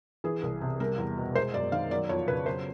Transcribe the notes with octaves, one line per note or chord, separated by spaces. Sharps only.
E3 G#4
C2
C3
G3 A#4
E2
B2
G#3 C5
F#2 D5
D#3 F5
F#3 D5
F2 C#5
C#3 B4
F#3 C5